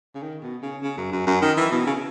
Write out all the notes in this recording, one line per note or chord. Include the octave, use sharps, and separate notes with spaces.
C#3
D#3
B2
C#3
C#3
F#2
F#2
F#2
D#3
E3
B2
C#3